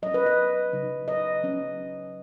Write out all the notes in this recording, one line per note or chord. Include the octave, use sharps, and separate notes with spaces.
F#3 C#4 D#5
B4
D#5
C#3 F#3 D#4
D#5
F#3 C#4